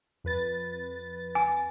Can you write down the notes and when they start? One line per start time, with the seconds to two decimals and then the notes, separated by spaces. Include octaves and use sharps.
0.24 F2 B4 A6
1.35 G#5